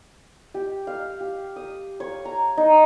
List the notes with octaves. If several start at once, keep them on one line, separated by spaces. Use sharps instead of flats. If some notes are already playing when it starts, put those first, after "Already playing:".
G4
F5
G4
D#6
C#5
A#5
D#4